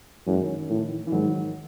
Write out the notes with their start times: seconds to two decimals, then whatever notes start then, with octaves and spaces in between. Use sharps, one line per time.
0.27 F#2 E3 G#3
0.42 D#3
0.56 D#3
0.69 A2 E3
0.79 D#3
0.89 E3
1.07 E3
1.12 G#2 D#3 F#3